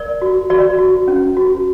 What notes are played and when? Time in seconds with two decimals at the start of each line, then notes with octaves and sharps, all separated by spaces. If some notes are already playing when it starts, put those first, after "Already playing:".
Already playing: A#4 D5
0.22 F#4
0.50 F#4 D5
0.78 F#4
1.08 C#4
1.37 F#4